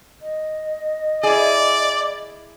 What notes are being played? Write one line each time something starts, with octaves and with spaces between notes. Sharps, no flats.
D#5
E4 G#4 D5